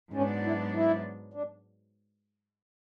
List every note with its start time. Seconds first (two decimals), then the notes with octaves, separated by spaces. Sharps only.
0.13 G#2 F#3 B3 C#4 D4
0.43 E4
0.74 E4
1.34 D4